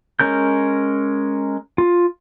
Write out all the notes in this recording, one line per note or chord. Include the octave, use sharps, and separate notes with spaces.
G#3 C#4 A#4 G6
F4